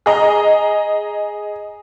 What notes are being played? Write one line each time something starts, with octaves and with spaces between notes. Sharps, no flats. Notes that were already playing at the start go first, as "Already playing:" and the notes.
G#4 D#5 A#5